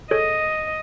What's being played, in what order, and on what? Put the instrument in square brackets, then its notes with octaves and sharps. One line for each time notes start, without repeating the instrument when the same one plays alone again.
[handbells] G#4 A4 C#5 [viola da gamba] D#5